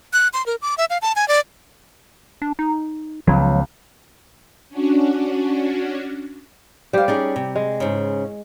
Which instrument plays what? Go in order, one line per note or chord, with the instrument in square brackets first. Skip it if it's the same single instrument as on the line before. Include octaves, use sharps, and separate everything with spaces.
[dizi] F#6
C6
A#4
D6
E5
F5
A5
G#5
D5
[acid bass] D4
D#4
[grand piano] C#2 [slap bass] F3 G#3 B3 [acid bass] F#3
[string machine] C#4 D4 F#4
[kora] G3 G4 [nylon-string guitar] C5 F5
[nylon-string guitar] C#4 D#4 G#4 [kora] D5
[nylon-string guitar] C3
[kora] G#3
[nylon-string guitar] G#2 C#3